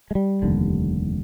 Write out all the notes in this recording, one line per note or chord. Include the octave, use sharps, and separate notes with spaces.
G#3
G3
F1 D#2 D3